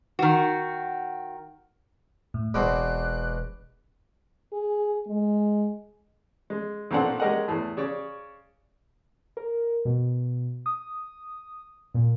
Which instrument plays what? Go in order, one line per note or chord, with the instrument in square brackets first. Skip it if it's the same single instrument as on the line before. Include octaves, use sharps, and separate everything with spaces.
[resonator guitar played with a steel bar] D#3 F#4
[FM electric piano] A2
[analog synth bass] E1 [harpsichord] E2 B2 C4 [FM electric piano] D6 [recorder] F#6
[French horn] G#4
G#3
[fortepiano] G#3
B1 A#2 C4 D4 F#5
G#3 C#4 G4 A#4 D#5 F#5
E2 A2
C#3 C#5 D5 C#6
[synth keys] A#4
B2
D#6
A#2